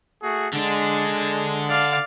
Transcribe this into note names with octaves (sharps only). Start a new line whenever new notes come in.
A3 F#4 G#4
D3 G#3 D4
D5 F5